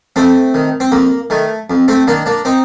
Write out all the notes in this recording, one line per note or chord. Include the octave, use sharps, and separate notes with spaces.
F2 A3 C4
D#3
C4
F2 A#3
D#3 A3
F2
A3 C4
D#3 A#3 D4
A#3 D4
C4 D#4